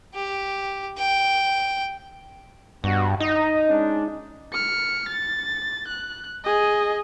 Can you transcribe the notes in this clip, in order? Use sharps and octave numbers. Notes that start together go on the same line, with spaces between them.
G4
G5
G2 B2 F#4
D#4 D#5
G#3 C#4 D4
F6 C#7
A6
F#6
G#4 D#5